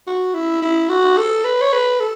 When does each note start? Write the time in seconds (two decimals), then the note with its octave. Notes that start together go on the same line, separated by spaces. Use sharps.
0.07 F#4
0.34 E4
0.62 E4
0.89 F#4
1.17 A4
1.44 B4
1.61 C#5
1.73 B4
2.00 A4